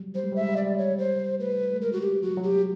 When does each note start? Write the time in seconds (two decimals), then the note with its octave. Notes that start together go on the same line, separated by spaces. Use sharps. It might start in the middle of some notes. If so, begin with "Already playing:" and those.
Already playing: F#3 G3
0.15 G3 C5
0.24 G#3
0.32 G3
0.36 E5
0.41 G#3
0.49 G3
0.57 G#3 D5
0.66 G3
0.78 C#5
0.98 G3 C5
1.40 A3 B4
1.73 A3
1.81 G#3 A#4
1.93 F#4
2.01 G4
2.22 F#3 F#4
2.37 F#3
2.43 G4